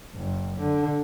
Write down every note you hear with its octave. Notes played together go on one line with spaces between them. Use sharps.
F#1
D3